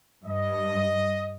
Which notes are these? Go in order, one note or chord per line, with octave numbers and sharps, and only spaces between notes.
G2 D#5